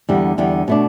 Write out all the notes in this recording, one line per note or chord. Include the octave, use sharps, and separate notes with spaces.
E2 D3 G3
E2 D3 G3
B2 A3 D4